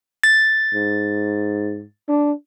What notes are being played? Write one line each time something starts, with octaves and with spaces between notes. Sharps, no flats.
A6
G#2
D4